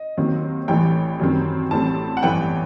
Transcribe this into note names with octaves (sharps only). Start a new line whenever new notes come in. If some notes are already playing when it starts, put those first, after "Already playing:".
Already playing: D#5
D#2 D#3 F#3 C4
A1 A2 E3 G3 G5
F#2 D#3 G3 C4
A1 A2 G3 C4 A5
F#5
A1 G2 E3 B3 G5